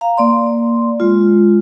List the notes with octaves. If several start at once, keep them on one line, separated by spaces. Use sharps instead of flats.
F5 A#5
A#3 D5 C6
G#3 F4